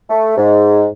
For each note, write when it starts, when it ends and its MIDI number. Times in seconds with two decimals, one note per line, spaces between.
0.10 0.37 57
0.37 0.86 44